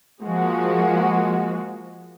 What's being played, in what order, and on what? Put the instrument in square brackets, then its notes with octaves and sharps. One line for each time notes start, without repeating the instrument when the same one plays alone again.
[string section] F3 G#3 A#3 F#4